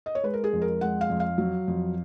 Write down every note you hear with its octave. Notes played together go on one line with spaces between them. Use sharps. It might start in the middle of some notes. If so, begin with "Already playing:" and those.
D#5
C#5
G#3 B4
A#4
G#4
F2
A#4
G#3 F#5
F5
F2
F5
F#3
F2